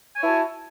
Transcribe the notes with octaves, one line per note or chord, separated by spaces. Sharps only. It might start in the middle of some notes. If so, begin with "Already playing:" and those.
E4 F#4 C#5 G#5 A5